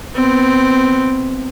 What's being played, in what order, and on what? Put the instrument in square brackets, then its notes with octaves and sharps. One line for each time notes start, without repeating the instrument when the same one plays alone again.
[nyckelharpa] B3 C4